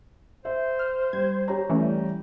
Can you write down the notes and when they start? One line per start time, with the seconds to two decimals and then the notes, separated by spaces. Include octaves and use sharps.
0.45 C5 E5
0.79 F6
1.13 G3 G#6
1.48 G4 C#5 A#5
1.69 E3 G3 A3 C#4